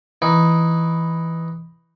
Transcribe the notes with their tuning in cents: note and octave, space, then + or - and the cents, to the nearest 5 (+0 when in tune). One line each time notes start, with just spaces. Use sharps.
E3 +0 D#4 +0